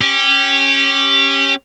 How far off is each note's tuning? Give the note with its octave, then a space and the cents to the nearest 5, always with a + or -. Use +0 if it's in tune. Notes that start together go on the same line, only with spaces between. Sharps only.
C#4 -15 G4 +0